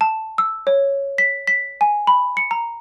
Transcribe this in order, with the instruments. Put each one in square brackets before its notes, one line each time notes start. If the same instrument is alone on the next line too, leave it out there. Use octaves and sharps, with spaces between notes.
[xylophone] A5
E6
C#5
B6
B6
G#5
B5
C#7
A#5